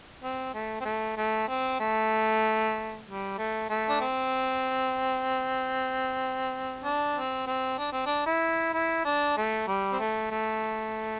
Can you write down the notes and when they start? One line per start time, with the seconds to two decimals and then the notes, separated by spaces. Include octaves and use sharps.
0.22 C4
0.54 A3
0.80 C4
0.85 A3
1.17 A3
1.48 C4
1.80 A3
3.06 G3
3.38 A3
3.69 A3
3.89 D4
4.01 C4
6.84 D4
7.16 C4
7.47 C4
7.78 D4
7.92 C4
8.06 D4
8.26 E4
8.73 E4
9.05 D4
9.37 A3
9.68 G3
9.92 C4
9.99 A3
10.31 A3